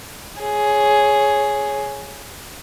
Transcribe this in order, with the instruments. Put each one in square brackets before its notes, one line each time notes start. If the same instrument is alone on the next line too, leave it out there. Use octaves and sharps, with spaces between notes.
[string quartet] G#4 C#5